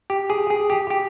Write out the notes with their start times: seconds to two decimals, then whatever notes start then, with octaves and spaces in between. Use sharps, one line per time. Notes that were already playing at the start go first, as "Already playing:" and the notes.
0.10 G4
0.30 G#4
0.50 G#4
0.70 G4
0.90 G4